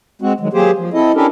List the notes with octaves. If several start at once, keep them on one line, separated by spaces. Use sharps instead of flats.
G#3 C4 F#4
D#3 F#3 G#3
F#3 A#3 G4 G#4 C5
F3
C4 E4 A4 D#5
C#4 D4 E4 G4 A4 A#4